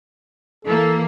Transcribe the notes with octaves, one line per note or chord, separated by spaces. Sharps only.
E3 A#3 A4